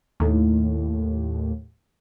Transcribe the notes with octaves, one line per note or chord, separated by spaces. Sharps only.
D#2 A2